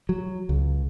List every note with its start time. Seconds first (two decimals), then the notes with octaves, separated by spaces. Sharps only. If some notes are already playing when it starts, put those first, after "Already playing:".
0.09 F#3
0.49 C#2